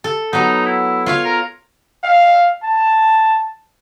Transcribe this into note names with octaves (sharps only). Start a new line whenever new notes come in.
A4
F#3 B3 D#4
E4
F4 C#5 F5
A#4
F5
A5